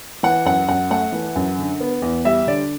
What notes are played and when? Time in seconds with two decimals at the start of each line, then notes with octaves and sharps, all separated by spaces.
0.23 E3 F#5
0.45 F#2 F#5
0.68 F#2 F#5
0.90 A3 F#5
1.12 E3
1.35 F#2
1.58 D3
1.81 B3
2.02 E2
2.25 G3 E5
2.47 D3 D5